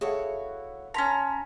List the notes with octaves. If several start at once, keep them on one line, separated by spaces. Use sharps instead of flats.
E4 F#4 G#4 A4 C#5 F5
C#4 A5 A#5 C6 B6